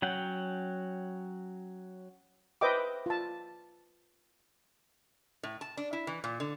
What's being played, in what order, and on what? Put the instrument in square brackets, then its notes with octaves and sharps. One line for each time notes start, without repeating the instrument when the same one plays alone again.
[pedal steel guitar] F#3 C#4 F#5 G5
[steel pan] B4 C5 D#5 E5 G5 D6
F4 A5
[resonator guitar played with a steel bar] A2
A5
D4
E4
E3
A#2
D3